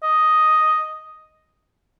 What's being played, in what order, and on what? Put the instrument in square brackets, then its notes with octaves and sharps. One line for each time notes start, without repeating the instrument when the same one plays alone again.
[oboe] D#5